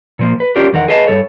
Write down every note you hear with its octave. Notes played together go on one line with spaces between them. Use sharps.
A#2 F3 A#3
B4
C#4 D4 F4 G4 A#4
E2 D#3 A#4 F#5
G#4 B4 D#5 F5 A5
G2 D#3 A4 C#5